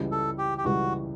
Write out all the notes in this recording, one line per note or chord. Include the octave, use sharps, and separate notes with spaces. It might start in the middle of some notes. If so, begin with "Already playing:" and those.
Already playing: C#2 C#3 E3 G3
A4
G4
G4
C#2 C#3 E3 G3 F#4